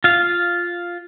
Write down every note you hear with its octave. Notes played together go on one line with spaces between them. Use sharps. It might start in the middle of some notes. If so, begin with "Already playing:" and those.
F4 F5